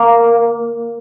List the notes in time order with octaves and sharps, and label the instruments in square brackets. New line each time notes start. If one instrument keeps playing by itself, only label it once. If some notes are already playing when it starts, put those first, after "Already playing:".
Already playing: [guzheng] A#3